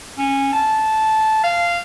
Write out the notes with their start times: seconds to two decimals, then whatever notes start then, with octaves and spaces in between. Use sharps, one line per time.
0.18 C#4
0.53 A5
1.44 F5